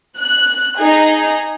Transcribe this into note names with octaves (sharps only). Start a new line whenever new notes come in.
F#6
D#4 G#4